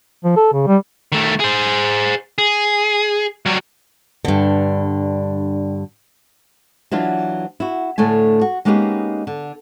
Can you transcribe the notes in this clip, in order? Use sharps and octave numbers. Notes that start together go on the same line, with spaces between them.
F3
A4
C#3
G3
D#3 A3
G#4 C5
G#4
F#3 G3
G2 D3
E3 F#3 D4 F4
E4 F#4
A2 D3 A3 G#5
F#4
G#3 A#3 B3 C#4 D#4 G4
D3